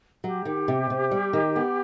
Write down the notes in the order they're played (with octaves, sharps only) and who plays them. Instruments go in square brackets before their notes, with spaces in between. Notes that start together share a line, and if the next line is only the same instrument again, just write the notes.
[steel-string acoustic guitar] F#3 [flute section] G4
[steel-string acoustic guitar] D#3
C3
C3
G3
D#3
B3